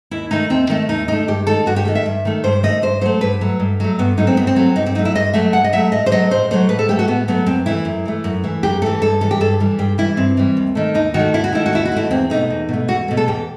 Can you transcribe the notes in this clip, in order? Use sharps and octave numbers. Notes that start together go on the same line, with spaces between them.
D#2 E4
D#3 A3 D#4
D#2 C4
D#3 A3
D#2 D#4
D#3 A3 D#4
G2 G4
D#3 A3 A4
G2 F#4
G4
D#3 A3
E5
G2
D#3 A3
G2 C5
D#3 A3 D#5
G2 C5
F#3 A3 C5
G2 B4
F#3 A3
G2
F#3 A3
G2 B3
F#3 A3 D#4
C4
G2 B3
C4
F#3 A3
G2 D#4
C4
F#3 A3 D#4
E4
G2 D#5
F#3 A3 E5
G2 F#5
D#5
F#3 A3 E5
A2 D#5
C5
F#3 A3 D#5
A2 C5
F#3 A3 C5
A2 B4
A4
F#3 A3 G4
F#4
A2 B3
F#3 A3 B3
F#2 C4
E3 A3 E4
F#2
E3 A3
F#2
E3 A3
F#2 G4
E3 A3 A4
G2 A4
E3 G3 A4
G4
G2 A4
E3 G3
G2 G4
E3 G3 E4
G2 C4
E3 G3
D#2
D#3 A3
D#2 D#4
D#3 F#4
A3
D#2 E4
F#4
D#3 A3 E4
F#4
D#2 E4
F#4
D#3 A3 E4
E2 C4
B2 A3 D#4
E2
B2 A3
E2 F#4
B2 A3
A4
E2 G4